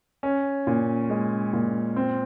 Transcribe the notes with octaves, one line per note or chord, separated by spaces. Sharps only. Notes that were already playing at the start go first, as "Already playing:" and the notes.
C#4
A#2
G#3
A#2
C4